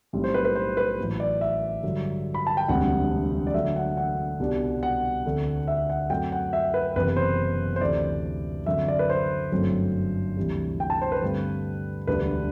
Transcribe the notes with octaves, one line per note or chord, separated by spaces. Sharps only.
B1 A2 G3 C4
C5
B4
B4
C5
B4
A1 A2 F#3
D5
E5
G2 D3 F#3
B5
A5
G5
E1 D2 C3 G3 C4 F#5
D5
D2 D3 F#3 E5
F#5
F#5
C2 B2 G3 D4
F#5
D2 D3 A3 C4
E5
F#5
F#2 F#3 A3 C4 G5
F#5
E5
B4
F#1 E2 C3 B4
C5
C5
D2 C3 E3 A3 D5
F#2 D3 F#3 C4 E5
D5
B4
C5
G1 F#2 F#3 A3 C4
D2 C3 E3 G3
G5
A5
C5
B4
G2 D3 A3 C4
E1 D2 D3 G3 D4 B4